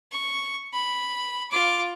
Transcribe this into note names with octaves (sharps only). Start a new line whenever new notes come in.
C#6
B5
F4 D6